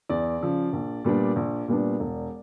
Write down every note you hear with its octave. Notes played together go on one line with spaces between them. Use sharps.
E2 D5
C#3 F3
A#1
A#2 G3 B3 D4
A#1
A#2 G3 B3 D4
E1